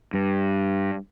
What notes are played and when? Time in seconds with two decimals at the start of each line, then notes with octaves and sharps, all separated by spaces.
0.14 G2